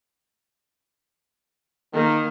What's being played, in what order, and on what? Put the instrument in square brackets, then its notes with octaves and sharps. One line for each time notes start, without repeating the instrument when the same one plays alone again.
[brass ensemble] D#3 [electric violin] A#3